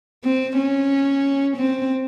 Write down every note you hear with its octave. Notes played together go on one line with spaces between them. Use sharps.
C4
C#4
C4